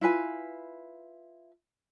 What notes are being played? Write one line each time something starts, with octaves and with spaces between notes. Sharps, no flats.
E4 F4 B4 G#5